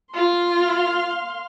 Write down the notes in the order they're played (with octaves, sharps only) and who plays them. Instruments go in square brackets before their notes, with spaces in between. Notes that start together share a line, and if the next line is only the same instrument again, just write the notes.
[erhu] F4 [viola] F5 C6